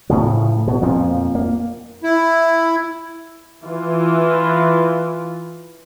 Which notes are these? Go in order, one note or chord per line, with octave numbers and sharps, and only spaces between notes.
A2 C#3 F3
B2
F2 A#2 F3
A#3
E4
E3 F4